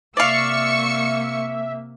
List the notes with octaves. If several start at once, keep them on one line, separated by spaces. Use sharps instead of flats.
C3 A#3 D5 E5 F5 C#6 E6 C#7